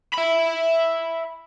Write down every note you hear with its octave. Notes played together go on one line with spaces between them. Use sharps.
E5 B5